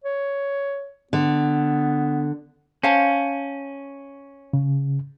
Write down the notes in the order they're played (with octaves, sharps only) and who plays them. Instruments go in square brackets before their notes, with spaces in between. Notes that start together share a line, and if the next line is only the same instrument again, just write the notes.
[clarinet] C#5
[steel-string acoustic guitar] D3 [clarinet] B3
[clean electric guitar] C#4 [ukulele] C5 F5 A5
[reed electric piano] C#3